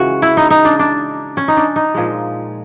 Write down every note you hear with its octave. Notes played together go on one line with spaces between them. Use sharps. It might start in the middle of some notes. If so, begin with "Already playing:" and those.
Already playing: C#3 E3 G#3 F#4
E4
D#4
D#4
D4
D4
C#4
D#4
D4
D#4
A#2 F3 G#3